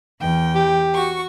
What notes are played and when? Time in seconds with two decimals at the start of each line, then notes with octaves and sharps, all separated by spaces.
0.20 E2 G5
0.55 G4
0.93 F#4 C#6